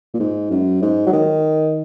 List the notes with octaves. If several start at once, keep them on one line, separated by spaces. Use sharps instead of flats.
A#2
G#2
F#2
G#2
F#3
D#3